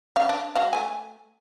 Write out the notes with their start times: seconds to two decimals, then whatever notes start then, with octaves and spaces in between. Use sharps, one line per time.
0.16 C#3 F5
0.29 D4
0.55 G#3 F#4 F5
0.73 A3 G#5